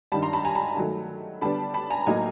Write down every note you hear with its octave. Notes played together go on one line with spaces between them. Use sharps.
G2 D#3 G3 A5 B5
A#5 C6
A5 B5
G#5 A#5
A5 B5
D#3 F#3 A3
D3 G3 B3 D4 A5 B5
A5 B5
G#5 A#5
A2 F#3 A#3 D#4 G#5 A#5